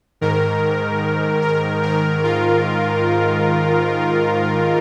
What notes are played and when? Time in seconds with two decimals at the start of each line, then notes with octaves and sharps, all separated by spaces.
0.21 G#2 D#3 A#4
1.42 A#4
1.83 G#2 D#3 A#4
2.24 F4